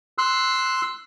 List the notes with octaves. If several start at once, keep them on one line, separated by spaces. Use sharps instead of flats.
C6 E6 F#6